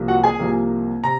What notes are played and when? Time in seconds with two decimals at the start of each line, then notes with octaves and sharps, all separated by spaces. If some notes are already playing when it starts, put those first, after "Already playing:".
Already playing: C2 C3 F3 A#3
0.08 F#4 F#5
0.24 G#4 G#5
0.39 C2 C3 F3 A#3
1.04 C3 A#5